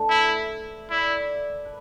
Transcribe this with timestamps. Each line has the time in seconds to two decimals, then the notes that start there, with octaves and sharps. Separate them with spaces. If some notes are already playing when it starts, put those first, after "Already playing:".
Already playing: A3 D4 A4 B4
0.09 E4 E5
0.28 E5
0.90 E4 D5
1.65 B4